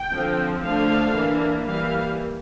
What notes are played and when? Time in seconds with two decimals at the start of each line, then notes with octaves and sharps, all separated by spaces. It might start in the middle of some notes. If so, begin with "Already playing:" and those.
Already playing: G5
0.12 D3 F3 C4
0.63 D3 F3 A3 D4 F5
1.15 E3 A#3 D4
1.66 E3 G3 A#3 F5